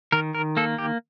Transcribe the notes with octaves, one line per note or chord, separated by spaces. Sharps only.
D#3 A#4
A#4
A#3 A4
G4